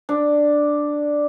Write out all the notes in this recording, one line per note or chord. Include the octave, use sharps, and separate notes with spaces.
D4